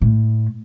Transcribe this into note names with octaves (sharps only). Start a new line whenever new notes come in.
A2